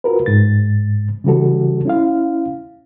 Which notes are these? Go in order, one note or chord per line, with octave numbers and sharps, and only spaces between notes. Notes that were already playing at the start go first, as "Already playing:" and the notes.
F4 F#4 A#4 B4
G#2 A6
C#3 E3 G3 F#4 A4
C#4 E4 F5